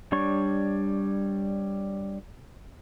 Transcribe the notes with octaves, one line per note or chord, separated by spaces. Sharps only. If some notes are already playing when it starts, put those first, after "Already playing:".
G3 D4 C#5 C#6